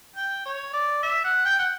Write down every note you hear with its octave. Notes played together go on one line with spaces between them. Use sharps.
G5
C#5
D5
E5
F#5
G5
F#5